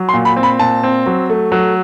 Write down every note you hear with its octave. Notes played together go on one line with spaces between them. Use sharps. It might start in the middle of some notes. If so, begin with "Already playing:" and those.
Already playing: F#3
C6
A#2
B5
C4
B5
A#2 A5
C4
F#3
A3
F#3